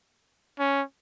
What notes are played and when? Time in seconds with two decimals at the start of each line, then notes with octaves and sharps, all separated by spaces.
0.59 C#4